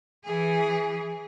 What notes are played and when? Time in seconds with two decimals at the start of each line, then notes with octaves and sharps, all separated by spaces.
0.25 E3 G#4